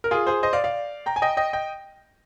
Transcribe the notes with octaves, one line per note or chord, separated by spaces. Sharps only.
A#4
F4 G#4
G#4 C5
C5 D#5
D5 F5
D5 F5
G5 A#5
G#5
D#5 G5
D#5 G5
D#5 G5